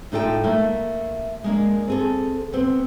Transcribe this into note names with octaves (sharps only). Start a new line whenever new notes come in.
A2 D#4 F4 A4 D5 G5
A3 A#3
G#3 A#3 D4
C4 G#4 A4
B3 C4